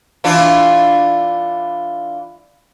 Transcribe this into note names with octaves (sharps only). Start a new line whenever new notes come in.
E3 D4 F4